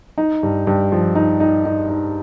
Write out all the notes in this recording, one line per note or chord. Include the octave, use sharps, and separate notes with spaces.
D#4
G2
G2
F3
D#4
D#4
D#4
D#4